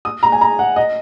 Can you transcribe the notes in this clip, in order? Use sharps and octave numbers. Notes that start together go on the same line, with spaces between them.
D#6
A#5
G#5
A#5
F#5
D#5